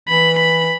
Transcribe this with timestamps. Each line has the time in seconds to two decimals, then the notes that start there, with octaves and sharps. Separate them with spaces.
0.09 E3 B5
0.39 B5